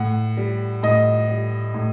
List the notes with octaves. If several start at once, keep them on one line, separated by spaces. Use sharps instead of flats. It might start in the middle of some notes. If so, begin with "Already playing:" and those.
Already playing: A2 F#5
G3
A2 D#5
G3
A2